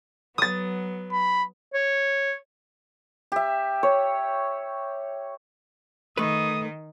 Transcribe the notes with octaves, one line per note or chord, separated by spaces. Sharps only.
F#3 B3 D#6 A6
B5
C#5
G4 E5
C#5
D#3 A3 B4 D#6